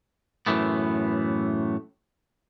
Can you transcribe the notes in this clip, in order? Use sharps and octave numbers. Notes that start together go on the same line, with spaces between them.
F#2 A2 E3 A3 B3